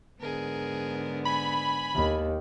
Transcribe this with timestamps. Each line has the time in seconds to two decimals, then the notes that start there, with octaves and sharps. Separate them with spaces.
0.20 G#2 D3 B3 G#4 A#4
1.25 G#5 B5
1.95 D#2